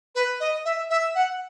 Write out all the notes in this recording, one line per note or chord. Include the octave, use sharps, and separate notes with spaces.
B4
D#5
E5
E5
F#5